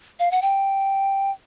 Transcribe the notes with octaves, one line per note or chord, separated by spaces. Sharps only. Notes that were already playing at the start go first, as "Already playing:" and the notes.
F5
F#5
G5